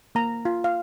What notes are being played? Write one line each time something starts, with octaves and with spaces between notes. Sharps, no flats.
A#3 A#5
F4
F5